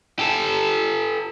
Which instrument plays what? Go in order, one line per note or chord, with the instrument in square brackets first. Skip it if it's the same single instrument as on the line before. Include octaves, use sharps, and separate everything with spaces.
[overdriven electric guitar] G4 A4